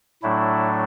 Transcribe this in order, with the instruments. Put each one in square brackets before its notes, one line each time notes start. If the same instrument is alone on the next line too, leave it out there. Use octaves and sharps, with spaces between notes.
[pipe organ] A2 F#3 A3 D4 E4